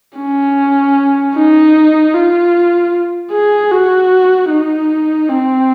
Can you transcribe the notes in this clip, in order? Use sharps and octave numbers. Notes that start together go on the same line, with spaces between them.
C#4
D#4
F4
G#4
F#4
D#4
C4